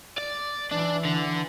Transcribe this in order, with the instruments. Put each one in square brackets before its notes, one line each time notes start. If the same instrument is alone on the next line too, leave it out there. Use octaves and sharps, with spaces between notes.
[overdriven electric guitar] D5
[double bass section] E3 [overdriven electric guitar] D4
[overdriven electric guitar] D3